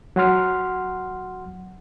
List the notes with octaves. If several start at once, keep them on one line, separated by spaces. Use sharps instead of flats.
F#3 F#5 C6 F6